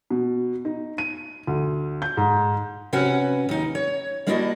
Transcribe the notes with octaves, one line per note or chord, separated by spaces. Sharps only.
B2
D#4
D#7
D2
G6
G#2
C3 C#4 F#4 B4 F#5
D#2 D#4
C#5
G3 A#3 D4 E4 F#4 D#5